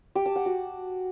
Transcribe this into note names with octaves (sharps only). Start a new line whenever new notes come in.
G4
A5
F#5
F#4